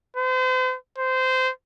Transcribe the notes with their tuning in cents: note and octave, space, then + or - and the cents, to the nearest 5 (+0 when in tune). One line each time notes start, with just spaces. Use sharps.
C5 -40
C5 -20